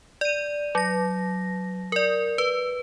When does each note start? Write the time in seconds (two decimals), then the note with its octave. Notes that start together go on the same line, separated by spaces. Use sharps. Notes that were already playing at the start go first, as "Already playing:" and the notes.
0.21 D5 D#7
0.75 F#3 A#6
1.92 A#4 D5
2.38 B4